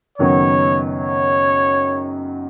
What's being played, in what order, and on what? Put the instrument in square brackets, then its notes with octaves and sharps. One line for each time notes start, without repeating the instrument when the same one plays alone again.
[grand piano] F#1 F#2 D#3 F#3 B3 [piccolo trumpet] C#5
[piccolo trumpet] C#5